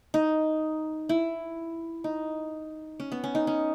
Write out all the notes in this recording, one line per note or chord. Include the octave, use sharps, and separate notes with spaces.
D#4
E4
D#4
C#4
B3
C#4
D#4
C#4